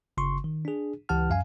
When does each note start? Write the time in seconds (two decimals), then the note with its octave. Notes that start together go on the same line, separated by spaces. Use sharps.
0.17 G1 C#3 C6 C#6
0.44 D#3
0.65 D4 G#4
1.09 C#2 E3 G4 F#5 A5 F6
1.30 F#2 F5 G#5